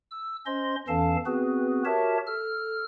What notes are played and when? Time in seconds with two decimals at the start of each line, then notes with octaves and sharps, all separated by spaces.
0.11 E6
0.46 C#4 C5 D#5 C6
0.88 E2 E3 C#4 A4 F5 A5
1.26 B3 C4 F#4 G#4 B4
1.85 F#4 G4 A#4 C#5 E5 A5
2.27 A4 F6